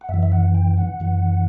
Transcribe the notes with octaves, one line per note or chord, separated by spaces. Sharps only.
F#5
F#2 E3 E5
E5
F#5
G5
F#5
F#2 E3